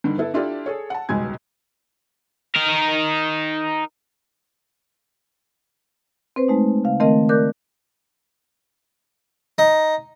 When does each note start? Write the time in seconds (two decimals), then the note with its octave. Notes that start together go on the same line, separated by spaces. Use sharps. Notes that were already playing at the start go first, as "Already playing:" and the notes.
0.04 G2 D3 D#3
0.18 B3 E4 A4
0.34 D4 E4 F4 G4 A4 D5
0.66 G#4 A4 C#5
0.90 F#5 A5
1.09 D#1 C#2 B2 G#3 G#5 G#6
2.55 D#4 A#4
6.36 C4 B4 C5
6.49 G#3 A3 D#4
6.84 C#3 F5
7.00 D#3 A3 C4 A#4 D#5
7.29 A#4 D5 D6 F#6 G6
9.58 D#4